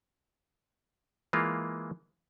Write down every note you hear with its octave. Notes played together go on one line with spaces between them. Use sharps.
E3 G#3 A#3 F4